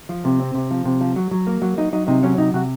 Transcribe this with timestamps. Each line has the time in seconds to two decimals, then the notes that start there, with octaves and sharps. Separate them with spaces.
0.09 F3
0.25 C3
0.40 C4
0.55 C3
0.71 F3
0.85 C3
1.01 F3
1.16 F#3
1.31 F#3
1.47 A#3
1.62 F#3
1.77 F#3 D#4
1.93 F#3 D#4
2.08 C3 D#4
2.23 F#3 C#4
2.38 C3 D#4
2.54 C3 F#4